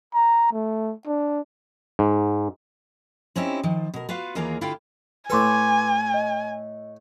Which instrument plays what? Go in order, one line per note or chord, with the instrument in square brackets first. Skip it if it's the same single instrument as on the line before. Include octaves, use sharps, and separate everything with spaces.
[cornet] A#5
A3
D4
[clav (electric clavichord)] G#2
[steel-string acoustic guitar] C4 C#4 D#4 E4 G4
D#3 F3
B2 A#4
F4 F#4 B4 F5
D#2 E3 A#3 F4 G#4 A#5
D3 E4 F4 G4 F5 G5
[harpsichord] A2 A4 [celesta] B4 C6 D6 [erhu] G#5
[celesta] D#5